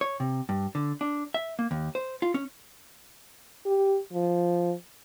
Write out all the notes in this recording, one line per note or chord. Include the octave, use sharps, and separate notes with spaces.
C#5
C3
G2
D3
D4
E5
A#3
D#2
C5
F4
C#4
G4
F3